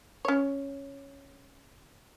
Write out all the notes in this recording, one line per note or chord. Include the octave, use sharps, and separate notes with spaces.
C#4 C#5